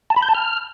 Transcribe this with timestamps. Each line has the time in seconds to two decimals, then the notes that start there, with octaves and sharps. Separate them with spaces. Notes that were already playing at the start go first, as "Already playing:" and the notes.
0.10 A5
0.16 B5
0.22 G6
0.29 A5
0.35 F6